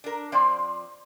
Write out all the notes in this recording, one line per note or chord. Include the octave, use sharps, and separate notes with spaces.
D4 A#4
F3 C4 C5 D5